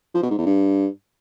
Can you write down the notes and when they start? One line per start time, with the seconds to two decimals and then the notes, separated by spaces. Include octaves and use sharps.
0.14 F3
0.22 B2
0.30 G#2
0.38 E2
0.46 G2